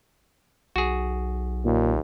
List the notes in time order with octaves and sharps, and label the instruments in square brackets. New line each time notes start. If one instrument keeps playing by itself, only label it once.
[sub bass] B1 [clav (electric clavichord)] F#4 G#4
[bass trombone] D#2 [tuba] A#2